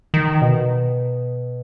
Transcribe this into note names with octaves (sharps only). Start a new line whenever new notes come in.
D#3
B2